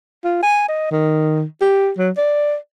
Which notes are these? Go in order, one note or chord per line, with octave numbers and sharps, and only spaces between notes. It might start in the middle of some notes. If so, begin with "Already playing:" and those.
F4
G#5
D#5
D#3
G4
F#3
D5